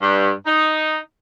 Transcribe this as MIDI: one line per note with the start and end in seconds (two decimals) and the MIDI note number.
0.02 0.31 43
0.46 0.98 63